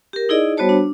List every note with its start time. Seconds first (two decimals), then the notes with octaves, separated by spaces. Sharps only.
0.13 G4 A#4
0.29 D#4 E4 G#4 D5 D#5
0.57 G3 B3 F#4 C5 C#5 A5
0.69 D4